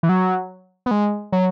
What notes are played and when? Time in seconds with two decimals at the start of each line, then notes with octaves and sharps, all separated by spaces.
0.03 E3
0.09 F#3
0.86 B3
0.91 G#3
1.32 F#3